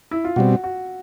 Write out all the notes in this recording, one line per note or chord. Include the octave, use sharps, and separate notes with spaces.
E4
F4
B2 G3 C4 F#4
F#4